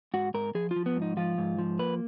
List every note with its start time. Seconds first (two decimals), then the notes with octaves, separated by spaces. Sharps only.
0.14 G#2 F#4
0.34 G#2 A#4
0.55 F3 G#4
0.71 F4
0.76 F3
0.86 B3
0.96 G#2
1.02 D#4
1.17 F3 F4
1.38 G#2
1.59 F3
1.79 A#3 B4